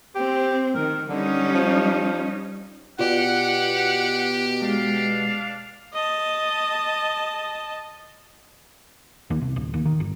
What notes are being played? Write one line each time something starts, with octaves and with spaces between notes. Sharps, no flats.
C4 G4
D#3 A#4
D3 G3 C#4 D#4
F3
B2 F4 G4 D5 F#5
G#3 D4 F5
D#5 A5
D#2
C2
D1
D#2
D#3
G1